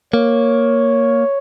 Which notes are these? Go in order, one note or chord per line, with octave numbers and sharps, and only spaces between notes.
A#3 C#5